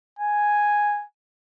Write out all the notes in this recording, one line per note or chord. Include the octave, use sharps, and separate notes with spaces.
G#5